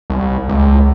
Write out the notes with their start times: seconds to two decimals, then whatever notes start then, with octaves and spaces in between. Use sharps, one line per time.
0.10 C2
0.49 C#2